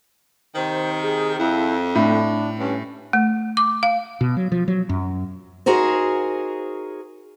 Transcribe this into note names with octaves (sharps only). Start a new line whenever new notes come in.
C3 D#3 C5
G#4
F2 E4
A2 D4
G2 C#4
A3
D6
F5
B2
F#3
F3
F#3
F#2
D#4 F#4 G#4 A#4 C5